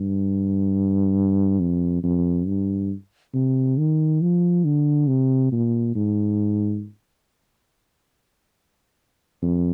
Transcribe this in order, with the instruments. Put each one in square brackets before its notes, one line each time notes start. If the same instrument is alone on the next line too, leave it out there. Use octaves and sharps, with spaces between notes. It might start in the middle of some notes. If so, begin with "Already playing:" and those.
Already playing: [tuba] G2
F2
F2
G2
C3
D#3
F3
D3
C3
A#2
G#2
F2